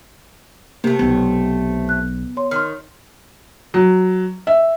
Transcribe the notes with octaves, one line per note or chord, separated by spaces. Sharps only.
C3 A3 A#3
B1 B3
F#6
C#5 C6
D#3 C6 F6
F#3
E5